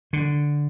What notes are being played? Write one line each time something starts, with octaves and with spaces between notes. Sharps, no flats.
D3